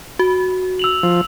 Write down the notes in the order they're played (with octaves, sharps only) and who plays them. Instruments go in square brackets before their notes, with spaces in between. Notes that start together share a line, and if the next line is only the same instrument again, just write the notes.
[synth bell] F#4
[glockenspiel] E6 F7 F#7
[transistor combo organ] F3